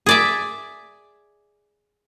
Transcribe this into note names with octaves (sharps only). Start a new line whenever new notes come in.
G#4 D5 E5